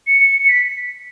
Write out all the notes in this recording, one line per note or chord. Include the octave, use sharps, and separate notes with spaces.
C#7
B6